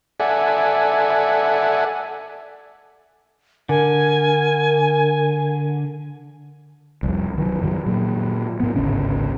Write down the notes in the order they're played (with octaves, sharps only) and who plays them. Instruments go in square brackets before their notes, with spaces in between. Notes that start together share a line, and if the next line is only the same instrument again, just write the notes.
[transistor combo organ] A4 D5 E5 F#5 G#5
[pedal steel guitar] D3 [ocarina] A#4 [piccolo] G#5
[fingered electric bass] C2 F2
D#3 F#3
F#2 D#3 F#3
A#2 F#3
A2 B3
G#1 D2 C#3 C#4